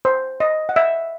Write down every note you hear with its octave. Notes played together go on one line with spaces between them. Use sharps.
C5
D#5
F#5
E5